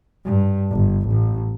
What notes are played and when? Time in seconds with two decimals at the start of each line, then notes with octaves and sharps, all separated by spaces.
0.25 G2
0.71 G1
1.08 A1